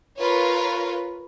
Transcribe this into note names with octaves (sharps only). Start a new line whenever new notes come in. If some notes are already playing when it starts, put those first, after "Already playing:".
F4 A#4 B4 C#5